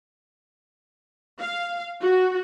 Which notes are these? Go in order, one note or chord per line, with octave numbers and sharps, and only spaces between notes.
F5
F#4